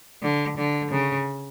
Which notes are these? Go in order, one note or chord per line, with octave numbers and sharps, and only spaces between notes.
D3
D3
C#3